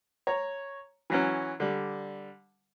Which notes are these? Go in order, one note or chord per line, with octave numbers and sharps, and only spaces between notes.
C#5 A#5
E3 F#3 C#4
D3 G3